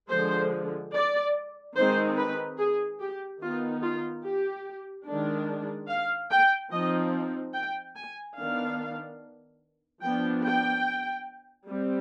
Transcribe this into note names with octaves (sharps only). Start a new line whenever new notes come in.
D3 F3 G#3 C5
D5
D#3 G#3 C4 D#4 C5
B4
G#4
G4
D#3 B3 D#4 F4
F4
G4
D#3 G#3 D4
F5
G5
F3 C4 D#4 D#5
G5
G#5
D#3 B3 D4 F5
F3 B3 D4 G5
G5
G3 C4